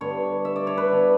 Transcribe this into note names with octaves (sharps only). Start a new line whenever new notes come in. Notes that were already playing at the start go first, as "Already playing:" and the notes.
G2 D3 G3 B3 C#5
E5
D5
C#5
B4
D3 G3 B3 D4